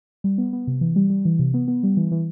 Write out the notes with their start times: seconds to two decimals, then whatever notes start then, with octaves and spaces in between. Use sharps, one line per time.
0.24 G3
0.38 B3
0.53 B3
0.67 C3
0.81 E3
0.96 G3
1.10 G3
1.25 E3
1.39 C3
1.54 B3
1.68 B3
1.83 G3
1.97 E3
2.11 E3